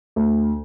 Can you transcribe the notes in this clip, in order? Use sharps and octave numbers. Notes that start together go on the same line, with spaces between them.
D2